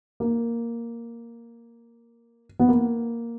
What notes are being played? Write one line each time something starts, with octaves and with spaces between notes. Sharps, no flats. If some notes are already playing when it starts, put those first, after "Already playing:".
A#3
B3
A#3